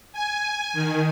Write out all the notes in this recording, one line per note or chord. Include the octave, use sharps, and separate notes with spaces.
G#5
D#3